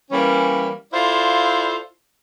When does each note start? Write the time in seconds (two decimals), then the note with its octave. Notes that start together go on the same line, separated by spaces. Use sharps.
0.11 E3 G3 A#3 C#4
0.92 E4 F4 A4 C5 D5 F5